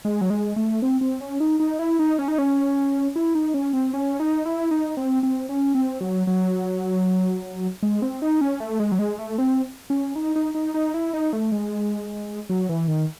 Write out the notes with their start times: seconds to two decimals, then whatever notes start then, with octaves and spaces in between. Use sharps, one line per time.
0.05 G#3
0.21 F#3
0.30 G#3
0.56 A3
0.82 C4
1.01 C4
1.21 C#4
1.40 D#4
1.60 D#4
1.79 E4
1.99 D#4
2.19 C#4
2.28 D#4
2.38 C#4
3.16 E4
3.35 D#4
3.54 C#4
3.73 C4
3.93 C#4
4.20 D#4
4.46 E4
4.71 D#4
4.97 C4
5.23 C4
5.49 C#4
5.75 C4
6.01 F#3
6.27 F#3
7.83 G#3
8.02 C4
8.22 D#4
8.41 C#4
8.60 A3
8.80 G#3
8.92 F#3
8.99 G#3
9.19 A3
9.38 C4
9.90 C#4
10.15 D#4
10.36 D#4
10.55 D#4
10.74 D#4
10.94 E4
11.13 D#4
11.33 A3
11.52 G#3
12.50 F#3
12.69 E3
12.88 D#3